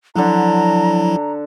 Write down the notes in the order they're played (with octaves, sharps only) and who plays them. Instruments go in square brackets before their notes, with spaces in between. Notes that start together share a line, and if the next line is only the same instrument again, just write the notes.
[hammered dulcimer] D3 A4 F#5 [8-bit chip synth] F3 F#3 E4 [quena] A#5